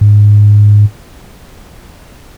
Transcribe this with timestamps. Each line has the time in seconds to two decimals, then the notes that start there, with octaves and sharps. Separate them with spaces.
0.01 G#2